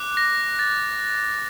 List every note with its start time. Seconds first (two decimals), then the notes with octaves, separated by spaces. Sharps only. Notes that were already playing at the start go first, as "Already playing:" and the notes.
Already playing: D6 F#6
0.17 A#6
0.59 A6